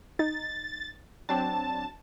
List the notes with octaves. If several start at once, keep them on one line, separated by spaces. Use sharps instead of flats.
D#4 A6
F#3 C4 D4 A5